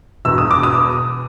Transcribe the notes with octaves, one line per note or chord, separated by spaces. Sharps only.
E1 E2 B2 E6
D#6
D6
D#6